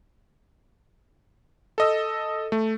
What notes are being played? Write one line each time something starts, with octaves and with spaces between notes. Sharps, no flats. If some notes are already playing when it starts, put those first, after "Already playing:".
A4 D#5 E6
A3